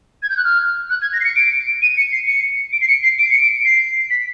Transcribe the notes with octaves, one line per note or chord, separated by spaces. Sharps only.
G#6
G6
F#6
F6
F#6
G#6
A#6
C7
C#7
D7
D#7
C#7
C7
C#7
D7
C7
C#7
C7
D7
C#7
D7
C7
B6